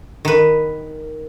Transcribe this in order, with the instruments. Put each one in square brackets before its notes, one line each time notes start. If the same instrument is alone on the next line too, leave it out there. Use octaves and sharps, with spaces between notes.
[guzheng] D#3 B4